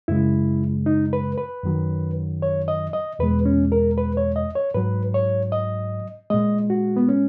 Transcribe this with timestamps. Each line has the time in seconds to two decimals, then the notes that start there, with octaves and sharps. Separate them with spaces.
0.08 F#2 C#3 G#3 E4
0.86 D#4
1.13 B4
1.38 B4
1.64 F#2 D#3 F#3
2.42 C#5
2.68 D#5
2.93 D#5
3.19 E2 B2 G#3 B4
3.46 C#4
3.72 A#4
3.98 B4
4.17 C#5
4.36 D#5
4.55 C#5
4.74 G#2 F#3 B4
5.14 C#5
5.52 D#5
6.30 A#2 G#3 D#5
6.70 F#4
6.96 B3
7.09 C#4